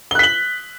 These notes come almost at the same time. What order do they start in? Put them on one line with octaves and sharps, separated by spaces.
G7 F#6 B6 F#7